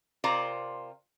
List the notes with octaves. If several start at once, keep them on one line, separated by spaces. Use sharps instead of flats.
C3 F4 A#4 C5 D5 A#5